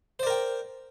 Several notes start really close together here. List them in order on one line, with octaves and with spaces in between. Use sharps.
C5 D5 A#4 G5